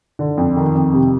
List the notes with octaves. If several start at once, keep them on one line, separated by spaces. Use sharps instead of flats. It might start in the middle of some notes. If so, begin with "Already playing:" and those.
D3
F2
D#3
F2
C3